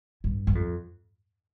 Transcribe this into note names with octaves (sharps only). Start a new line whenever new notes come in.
G2
G2
F2